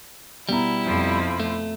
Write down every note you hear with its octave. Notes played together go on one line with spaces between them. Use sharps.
B2 G3 B3 E4 A#5
F2 F3
A3